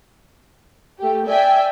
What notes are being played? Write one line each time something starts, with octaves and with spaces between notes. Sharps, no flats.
A3 G4
D5 E5 G5 G#5